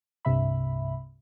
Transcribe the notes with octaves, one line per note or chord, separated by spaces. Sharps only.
C2 G2 C3 E5 B5